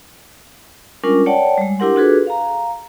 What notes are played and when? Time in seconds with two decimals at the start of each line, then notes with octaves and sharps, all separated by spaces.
1.04 G3 G#3 C#4 D4 F4 A#4
1.26 C#5 D5 F#5 G5 A5
1.58 G3 G#3
1.79 D4 E4 G4 A#4 F#5 C6
1.96 D4 F4 F#4 G#4 A4 B4
2.27 F5 A#5